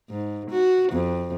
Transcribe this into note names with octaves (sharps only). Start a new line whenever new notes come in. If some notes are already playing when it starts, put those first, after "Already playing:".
G#2
F#4
F2